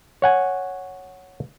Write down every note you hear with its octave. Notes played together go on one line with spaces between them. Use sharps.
C#5 F#5 G#5